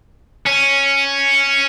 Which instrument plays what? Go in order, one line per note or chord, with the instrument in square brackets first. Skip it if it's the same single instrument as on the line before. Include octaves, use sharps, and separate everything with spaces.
[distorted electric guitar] C#4